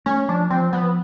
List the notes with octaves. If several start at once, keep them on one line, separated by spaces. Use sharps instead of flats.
A3 C#4
F3 D4
F3 C4
F3 B3